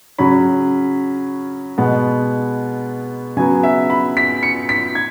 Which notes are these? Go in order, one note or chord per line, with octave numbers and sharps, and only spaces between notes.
C#3 F#3 C#4 B5
B2 G#3 B3
C#3 F#3 B3 G#5
E5
B5
B6
C#7
B6
G#6